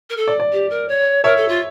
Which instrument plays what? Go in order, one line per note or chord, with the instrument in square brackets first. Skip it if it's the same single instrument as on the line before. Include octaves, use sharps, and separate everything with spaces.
[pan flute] A#4
A4
[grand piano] D5
D5
[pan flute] G4
A#4
C#5
[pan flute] A#4 [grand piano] C#5 E5
[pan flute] A4
F4